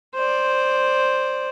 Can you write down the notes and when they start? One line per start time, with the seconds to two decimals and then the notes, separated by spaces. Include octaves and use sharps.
0.14 C5 D5